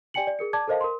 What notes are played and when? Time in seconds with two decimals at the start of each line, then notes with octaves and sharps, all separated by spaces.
0.14 G4 D5 G5 G#5 C#7 F#7
0.27 D5
0.39 G#4 A#4 C#7
0.53 D5 A5 D6 G#6
0.67 A4 A#4 C5 D#5 F5 A5
0.81 A#4 C6